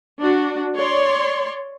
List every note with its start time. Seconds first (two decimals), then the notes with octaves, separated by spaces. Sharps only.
0.22 D4 F#4
0.76 C#5 D5 C6